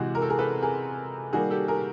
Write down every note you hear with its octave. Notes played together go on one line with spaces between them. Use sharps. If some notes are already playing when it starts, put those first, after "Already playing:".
Already playing: C3 E3 G#3 F#4 G#4
A#4
A4
G#4 A#4
A4 B4
G#4 A#4
D#3 G3 A#3 F#4 G#4
G4 A4
G#4 A#4